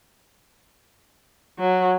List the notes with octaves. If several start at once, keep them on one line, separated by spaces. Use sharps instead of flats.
F#3